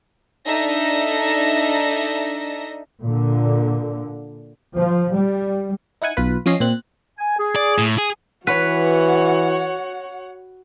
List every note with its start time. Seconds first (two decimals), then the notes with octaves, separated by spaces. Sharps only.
0.45 D4 D#4 A4 E5 A#6
3.04 A#2 D3
4.74 F3
5.13 G3
6.02 D#4 E4 F#5 G#5
6.17 B1 F4 B4
6.46 F3 C4 C#4 D#5 C7
6.60 A#2 C4 F#6
7.18 G#5
7.38 G#4
7.56 D5
7.78 A2
7.98 G#4
8.47 E3 F#4 B4 C#5 F#5